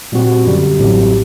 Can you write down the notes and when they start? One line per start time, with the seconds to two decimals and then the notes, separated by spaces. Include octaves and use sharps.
0.12 A#2 G3 C4 F#4
0.45 F#2 D3 G3
0.79 A1 A2 F#3 C4 G4